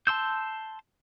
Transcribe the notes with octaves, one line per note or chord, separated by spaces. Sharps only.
A5 C6 E6 G6